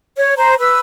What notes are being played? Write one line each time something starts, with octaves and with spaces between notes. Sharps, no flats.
C#5
C5 A#5
B4 E6